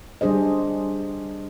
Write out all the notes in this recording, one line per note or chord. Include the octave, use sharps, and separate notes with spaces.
G3 D4 G#4 C5 D#5